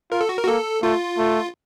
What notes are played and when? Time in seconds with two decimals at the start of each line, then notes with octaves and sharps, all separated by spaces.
0.12 F4 A#4
0.21 A4
0.29 F#4
0.38 A#4
0.43 F#4
0.47 A#3 A4
0.83 A3 F4
1.18 A3